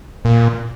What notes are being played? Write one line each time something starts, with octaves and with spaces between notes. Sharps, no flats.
A#2